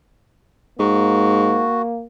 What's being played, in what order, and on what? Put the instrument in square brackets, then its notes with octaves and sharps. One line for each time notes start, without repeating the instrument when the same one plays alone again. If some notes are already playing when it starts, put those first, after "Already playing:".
[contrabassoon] G#2 [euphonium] A#3 [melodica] F#4